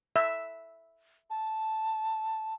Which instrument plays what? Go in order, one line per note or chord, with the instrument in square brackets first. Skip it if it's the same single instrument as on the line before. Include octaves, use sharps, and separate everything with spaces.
[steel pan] E5
[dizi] A5